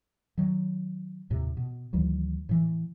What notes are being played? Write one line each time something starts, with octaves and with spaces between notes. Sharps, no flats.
D#3 F#3
D#2 A2 C3
B2
D2 D#3 E3 F#3
A2 E3